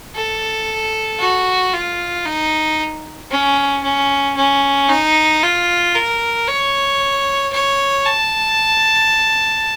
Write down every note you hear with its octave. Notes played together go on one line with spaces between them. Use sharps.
A4
F#4
F4
D#4
C#4
C#4
C#4
D#4
F4
A#4
C#5
C#5
A5